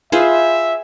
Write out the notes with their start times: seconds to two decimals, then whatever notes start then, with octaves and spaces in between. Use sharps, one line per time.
0.12 F4 G#4 B4 C5 E5